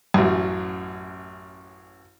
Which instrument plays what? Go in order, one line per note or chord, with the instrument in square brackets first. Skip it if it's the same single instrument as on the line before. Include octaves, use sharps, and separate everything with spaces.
[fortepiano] A1 F#2